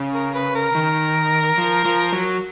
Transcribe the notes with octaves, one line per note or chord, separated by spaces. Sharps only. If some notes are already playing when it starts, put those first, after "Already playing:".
Already playing: C#3
A#4
B4
A#4
D#3
F3
F3
F#3